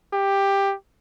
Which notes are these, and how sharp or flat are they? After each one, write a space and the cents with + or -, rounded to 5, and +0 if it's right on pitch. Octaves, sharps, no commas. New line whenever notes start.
G4 +10